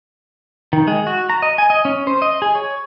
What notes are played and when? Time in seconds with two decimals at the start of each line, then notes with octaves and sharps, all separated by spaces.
0.73 D#3
0.88 G#3
1.07 F#4
1.30 A#5
1.42 D#5
1.58 G#5
1.70 D#5
1.85 C#4
2.07 C5
2.22 D#5
2.42 G#4
2.55 C#5